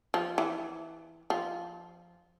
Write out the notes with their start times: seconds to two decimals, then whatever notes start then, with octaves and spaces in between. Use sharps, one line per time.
0.14 F3
0.38 E3
1.30 F3